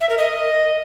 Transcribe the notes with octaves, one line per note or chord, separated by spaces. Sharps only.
E5
A#4
D#5